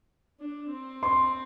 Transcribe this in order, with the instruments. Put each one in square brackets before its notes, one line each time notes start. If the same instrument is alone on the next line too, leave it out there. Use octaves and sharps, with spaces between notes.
[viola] D4
C4
[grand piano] C6